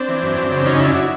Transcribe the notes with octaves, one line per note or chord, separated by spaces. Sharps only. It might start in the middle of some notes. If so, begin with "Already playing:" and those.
Already playing: C4 D4
E3
F#2
F#2
C#3
F#2 C#4 D#4
F#2 D4 E4
E4 F#4